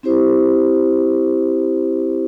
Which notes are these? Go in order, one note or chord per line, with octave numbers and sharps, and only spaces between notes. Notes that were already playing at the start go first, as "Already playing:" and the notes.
C4 E4 G4 C5